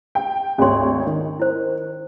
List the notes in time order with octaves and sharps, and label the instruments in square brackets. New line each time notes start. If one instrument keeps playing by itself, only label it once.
[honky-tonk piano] G5
[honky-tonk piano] G#1 D2 C#5 [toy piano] C#4 C6
[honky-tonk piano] D#3
[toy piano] E4 C5